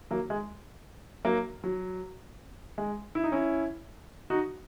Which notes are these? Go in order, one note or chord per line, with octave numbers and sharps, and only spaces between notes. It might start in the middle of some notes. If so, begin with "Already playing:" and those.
F#3 A#3
G#3
F#3 A#3
F#3
G#3
E4
D#4
C#4 E4
D#4 F#4